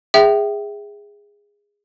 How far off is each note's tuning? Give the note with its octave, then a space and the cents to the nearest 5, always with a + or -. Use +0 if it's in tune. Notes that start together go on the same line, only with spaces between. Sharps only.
G#4 -15 E5 +0 G5 -25